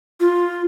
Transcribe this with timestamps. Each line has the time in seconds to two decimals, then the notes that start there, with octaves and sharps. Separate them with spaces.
0.20 F4